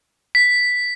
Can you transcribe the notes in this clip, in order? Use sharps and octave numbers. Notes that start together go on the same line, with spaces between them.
B6